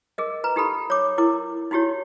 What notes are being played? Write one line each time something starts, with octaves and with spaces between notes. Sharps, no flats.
G#4 A#4 D#5
B4 A#5
D#4 G4 A4 B5
C#5 D6
E4 A#4 D6
D#4 E4 F#4 G4 C#5